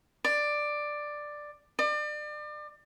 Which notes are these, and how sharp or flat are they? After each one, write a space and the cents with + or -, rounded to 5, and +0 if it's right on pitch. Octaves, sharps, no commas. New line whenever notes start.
D5 +10
D5 +35